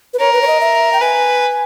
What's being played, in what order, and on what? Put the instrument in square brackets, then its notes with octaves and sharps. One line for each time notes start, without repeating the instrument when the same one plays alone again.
[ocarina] B4
[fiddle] A#4 [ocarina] C#5
[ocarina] B4
C#5
D#5
E5
G5
[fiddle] B4 [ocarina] G#5